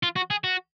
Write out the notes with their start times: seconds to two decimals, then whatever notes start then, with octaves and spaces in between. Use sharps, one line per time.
0.03 F4
0.16 F#4
0.30 G#4
0.44 F#4